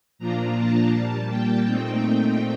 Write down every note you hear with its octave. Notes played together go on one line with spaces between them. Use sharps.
A#2 F3 A#3 D4 F4 A#5
A5
A#2 G3 A#3
G5
A#2 A3 C4 D#4